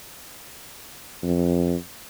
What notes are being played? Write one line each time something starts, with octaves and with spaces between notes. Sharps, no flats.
F2